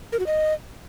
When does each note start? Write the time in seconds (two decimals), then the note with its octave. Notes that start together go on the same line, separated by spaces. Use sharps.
0.12 A#4
0.19 F#4
0.26 D#5